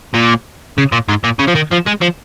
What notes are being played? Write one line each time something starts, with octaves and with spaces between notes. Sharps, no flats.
A#2
C#3
A#2
G#2
A#2
C#3
F3
D#3
F3
G#3
F3